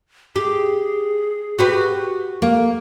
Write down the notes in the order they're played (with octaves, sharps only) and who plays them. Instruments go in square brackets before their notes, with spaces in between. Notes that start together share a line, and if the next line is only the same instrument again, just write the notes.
[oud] G4 [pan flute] G#4
[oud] F#4 G4 B4
[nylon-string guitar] A#3